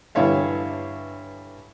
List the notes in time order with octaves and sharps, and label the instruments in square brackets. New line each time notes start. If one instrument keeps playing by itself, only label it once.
[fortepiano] G2 D3 E3 C#5 E5 F5